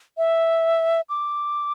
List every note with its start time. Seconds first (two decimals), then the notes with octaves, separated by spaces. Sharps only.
0.18 E5
1.09 D6